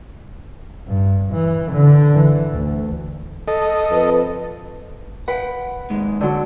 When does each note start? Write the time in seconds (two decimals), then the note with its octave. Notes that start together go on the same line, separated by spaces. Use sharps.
0.88 G2
1.32 E3
1.72 D3
2.14 E3
2.53 D2
3.48 A4 D#5
3.91 F2 B4
5.28 B4 F#5 G5
5.90 D#2 G#2 G#3
6.21 D3 F#3